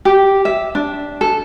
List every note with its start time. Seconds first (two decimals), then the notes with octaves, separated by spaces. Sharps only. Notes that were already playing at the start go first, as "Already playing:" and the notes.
0.05 G4
0.45 E5
0.75 D4
1.21 A4